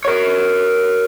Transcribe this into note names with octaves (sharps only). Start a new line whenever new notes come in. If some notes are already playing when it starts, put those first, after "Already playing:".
A#4 C#5